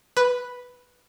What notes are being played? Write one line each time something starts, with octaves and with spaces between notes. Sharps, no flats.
B4